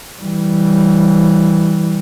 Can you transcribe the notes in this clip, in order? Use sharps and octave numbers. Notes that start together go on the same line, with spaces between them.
E3 G3